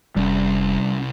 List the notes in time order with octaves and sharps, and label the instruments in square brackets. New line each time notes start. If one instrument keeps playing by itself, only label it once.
[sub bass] F1 [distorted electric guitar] C2 [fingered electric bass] G3 C#4